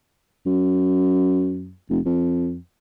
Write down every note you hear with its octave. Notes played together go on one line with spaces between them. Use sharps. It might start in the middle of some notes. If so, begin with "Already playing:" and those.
F#2
F1
F2